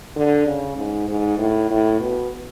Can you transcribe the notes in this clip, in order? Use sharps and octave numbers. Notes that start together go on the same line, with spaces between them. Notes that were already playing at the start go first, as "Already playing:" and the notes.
D3
C#3
G#2
G#2
A2
A2
B2